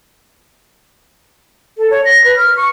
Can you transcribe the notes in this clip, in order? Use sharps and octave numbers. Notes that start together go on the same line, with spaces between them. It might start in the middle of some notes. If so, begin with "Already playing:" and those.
A4
C#5
A#6
B4
F6
C#6